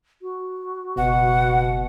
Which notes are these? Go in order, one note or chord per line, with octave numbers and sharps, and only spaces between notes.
F#4
F#1 B2 F#5